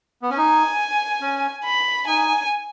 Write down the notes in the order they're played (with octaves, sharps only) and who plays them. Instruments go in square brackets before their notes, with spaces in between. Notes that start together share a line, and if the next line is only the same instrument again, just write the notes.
[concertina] B3
C#4
[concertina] D#4 [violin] G#5
[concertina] C#4
[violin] B5
[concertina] D#4 [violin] G#5